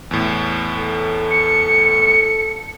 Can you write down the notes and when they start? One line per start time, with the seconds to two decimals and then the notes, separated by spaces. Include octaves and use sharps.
0.11 E2 A2
0.78 A4
1.31 C#7